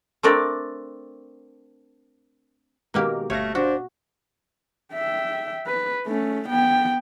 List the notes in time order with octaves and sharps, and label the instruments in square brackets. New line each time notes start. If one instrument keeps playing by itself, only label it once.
[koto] A3 C4 D4 A#4 D5
[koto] B2 A#3 G4 [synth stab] D#3 G#3 A#4
[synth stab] G1 F5 A#6 [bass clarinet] A3 [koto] C#5
[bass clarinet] D4 [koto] F#4 [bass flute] C5
[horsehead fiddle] E5 G5
B4
A3 C#4
B3 G5